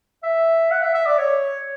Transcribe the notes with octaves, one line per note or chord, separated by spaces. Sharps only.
E5
F#5
E5
E5
D5
C#5